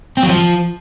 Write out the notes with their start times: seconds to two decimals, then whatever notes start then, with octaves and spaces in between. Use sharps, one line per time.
0.17 C4
0.23 F#3
0.29 F3